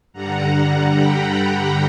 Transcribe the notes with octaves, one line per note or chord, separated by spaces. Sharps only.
G2 D3 G3 F#5 A#5
G5 B5